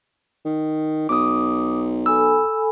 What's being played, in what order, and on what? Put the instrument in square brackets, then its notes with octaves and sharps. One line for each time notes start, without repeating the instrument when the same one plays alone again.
[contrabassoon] D#3
[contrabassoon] B1 [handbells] D6 D#6
[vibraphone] A4 G#5 B5 [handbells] E6